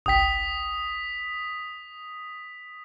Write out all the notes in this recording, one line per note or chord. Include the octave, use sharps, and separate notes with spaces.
G1 C2 G5 D#6 B6